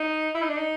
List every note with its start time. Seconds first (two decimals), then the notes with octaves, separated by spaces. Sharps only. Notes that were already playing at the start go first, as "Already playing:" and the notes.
Already playing: D#4
0.34 E4
0.42 D#4
0.49 D4
0.57 D#4